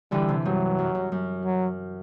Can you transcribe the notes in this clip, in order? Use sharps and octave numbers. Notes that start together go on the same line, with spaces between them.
D3 E3 G3
C3
G2 F#3
F#2
F#2
F#2
F#3